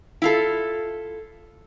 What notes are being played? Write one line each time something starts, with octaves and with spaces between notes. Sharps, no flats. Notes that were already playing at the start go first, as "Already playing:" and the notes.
E4 F4 A4